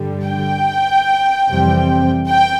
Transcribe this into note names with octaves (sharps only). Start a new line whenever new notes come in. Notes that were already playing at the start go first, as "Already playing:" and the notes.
Already playing: G2 D3 G3
G5
F2 C3 E3 G3 C4
G5